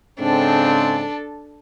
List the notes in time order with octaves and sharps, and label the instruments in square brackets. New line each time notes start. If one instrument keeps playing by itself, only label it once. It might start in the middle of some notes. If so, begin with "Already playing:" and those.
[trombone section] G#2 C#3 C4 [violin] D4 A4